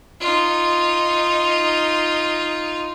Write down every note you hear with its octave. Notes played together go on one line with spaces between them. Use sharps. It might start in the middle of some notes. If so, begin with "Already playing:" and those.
D#4 F4